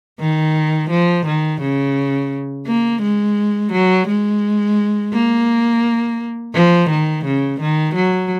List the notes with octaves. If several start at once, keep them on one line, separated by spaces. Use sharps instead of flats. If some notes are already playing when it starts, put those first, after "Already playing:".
D#3
F3
D#3
C#3
A#3
G#3
F#3
G#3
A#3
F3
D#3
C#3
D#3
F#3